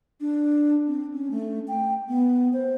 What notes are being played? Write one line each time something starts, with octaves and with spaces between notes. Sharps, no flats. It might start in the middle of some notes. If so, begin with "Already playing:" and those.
D4
C4
C#4
A3
G5
B3
C5